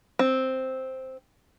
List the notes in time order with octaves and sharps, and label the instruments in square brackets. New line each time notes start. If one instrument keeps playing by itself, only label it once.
[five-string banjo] C4